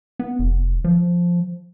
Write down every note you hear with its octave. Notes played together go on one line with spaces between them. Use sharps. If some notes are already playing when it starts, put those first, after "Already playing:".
B3
F1
F3